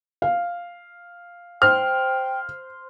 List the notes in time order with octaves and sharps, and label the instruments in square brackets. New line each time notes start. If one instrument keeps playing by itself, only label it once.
[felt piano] F5
[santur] C5 [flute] G5 [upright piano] F6